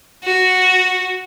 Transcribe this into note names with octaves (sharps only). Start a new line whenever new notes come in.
F#4